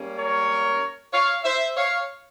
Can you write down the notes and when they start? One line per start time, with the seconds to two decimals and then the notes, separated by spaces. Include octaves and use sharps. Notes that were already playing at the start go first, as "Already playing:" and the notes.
Already playing: G#2 G3 A#3 C#4
0.17 A#4 C#5
1.12 C#5 F5
1.44 C5 E5
1.76 C#5 F5